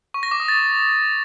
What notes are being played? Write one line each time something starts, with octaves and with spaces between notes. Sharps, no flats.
C#6
A#6
D6
D#6
A6